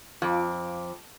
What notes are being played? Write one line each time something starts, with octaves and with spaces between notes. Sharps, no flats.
F2 F4 D6